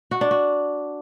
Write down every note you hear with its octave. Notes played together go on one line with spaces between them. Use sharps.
F#4
D4
F#4